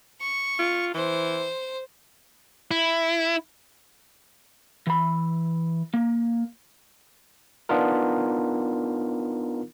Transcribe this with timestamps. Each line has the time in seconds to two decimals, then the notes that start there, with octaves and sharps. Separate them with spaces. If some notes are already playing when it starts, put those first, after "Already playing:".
0.21 C#6
0.59 F4
0.94 E3 C5
2.71 E4
4.87 E3 B5
5.94 A#3
7.69 B3 D4 D#4 F4 A#4